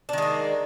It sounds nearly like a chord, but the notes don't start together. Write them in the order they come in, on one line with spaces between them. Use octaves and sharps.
D4 D#3 G#3 A#3